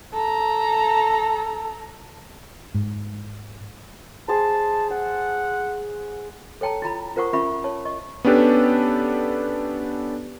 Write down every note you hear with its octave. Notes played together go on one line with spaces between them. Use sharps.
A4 A#5
G#2
G#4 C5 A5
F#5 E6
A4 C#5 G5 A5 A#5
E4 F4 A#5 B5
F4 A#4 C5 F#5 C#6 D#6
C#4 F4 A#4 E5 B5 C#6
C#5 A5
D#5 C#6
B3 C#4 D4 G4 A4 B4